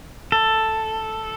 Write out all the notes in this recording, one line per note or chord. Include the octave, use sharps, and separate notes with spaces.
A4